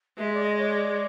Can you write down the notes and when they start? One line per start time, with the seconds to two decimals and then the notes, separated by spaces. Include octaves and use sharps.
0.18 G#3 E5
0.33 D5
0.43 D#5
0.58 C#5
0.68 D5